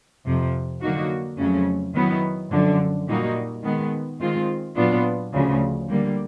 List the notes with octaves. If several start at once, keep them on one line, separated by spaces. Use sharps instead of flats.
F2 C3 F3
D3 F#3 A#3 D#4 F#4
F2 C#3 F#3 A3 C#4
D#3 F#3 B3 E4
F#2 D3 F3
A#2 G3 A#3 D#4 F#4
D#3 G#3 B3
D#3 G#3 C4 F4
A#2 F#3 B3 D4 F4
D2 C#3 F3
D3 G3 A#3